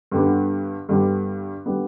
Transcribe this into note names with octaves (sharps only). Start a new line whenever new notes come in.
G2 D3 G3 B3
G2 D3 G3 B3
D3 G3 B3